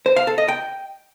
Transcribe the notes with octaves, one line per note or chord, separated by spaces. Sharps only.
C5
F5
A4
D#5
G5